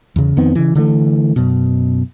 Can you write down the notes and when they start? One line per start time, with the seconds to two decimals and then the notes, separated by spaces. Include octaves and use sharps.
0.16 E2 C#3
0.37 F2 D#3 B3 C4
0.55 C#3 E3
0.75 D3 E3 A3
1.36 F#2 B2